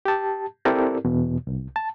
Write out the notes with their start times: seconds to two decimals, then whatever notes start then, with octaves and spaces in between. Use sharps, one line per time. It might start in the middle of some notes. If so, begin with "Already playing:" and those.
0.05 G4 A5
0.65 C4 E4 G4 A4 A#4 D5
1.05 E2 B2
1.47 C2
1.76 A5